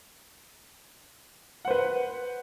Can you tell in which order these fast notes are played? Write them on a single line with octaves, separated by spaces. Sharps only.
F#5 C5 B4